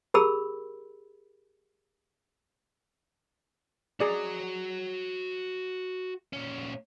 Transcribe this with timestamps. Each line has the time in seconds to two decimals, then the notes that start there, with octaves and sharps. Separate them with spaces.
0.14 G4 G#4 A#4 B5 E6
4.00 F#4 G#4 D5 A#5
6.33 A#2 C#4